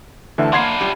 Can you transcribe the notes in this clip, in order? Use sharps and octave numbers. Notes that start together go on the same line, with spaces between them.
D2 D3 E3 E5 A5
A#3 D4 E4 C#5 F#5 C6 G#6 C7
G3 F4 G4